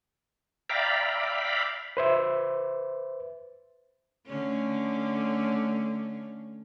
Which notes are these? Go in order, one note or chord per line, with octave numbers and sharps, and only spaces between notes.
D5 E5 F5 G5 A#5 B5
B4 C5 E5
D3 A3 C#4